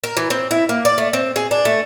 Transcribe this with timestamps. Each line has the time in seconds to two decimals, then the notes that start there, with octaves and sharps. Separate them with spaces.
0.04 A#4
0.17 E3
0.30 C4
0.51 E4
0.69 A#3
0.85 D5
0.98 A3
1.13 C4
1.36 G#4
1.51 D4
1.65 A3